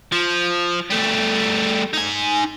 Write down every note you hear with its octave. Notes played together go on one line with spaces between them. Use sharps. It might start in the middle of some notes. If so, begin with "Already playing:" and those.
F3
G3 A3
D#4 G#5